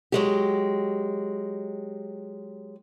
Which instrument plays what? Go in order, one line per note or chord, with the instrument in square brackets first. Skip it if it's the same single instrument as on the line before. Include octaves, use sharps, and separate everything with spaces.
[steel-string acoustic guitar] F#3 G#3 G4